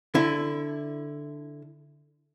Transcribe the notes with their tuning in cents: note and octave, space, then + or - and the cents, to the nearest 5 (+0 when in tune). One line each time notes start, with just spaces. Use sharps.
D3 +0 E4 +0